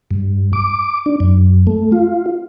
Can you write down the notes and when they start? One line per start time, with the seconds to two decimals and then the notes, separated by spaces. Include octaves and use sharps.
0.11 G2
0.53 D6
1.06 D4
1.20 F#2
1.67 A3
1.92 F4